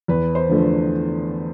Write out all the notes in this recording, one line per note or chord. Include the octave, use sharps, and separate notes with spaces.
E2 B4
C5
D3 F3 A3